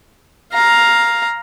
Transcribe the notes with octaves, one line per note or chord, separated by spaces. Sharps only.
F5 A#5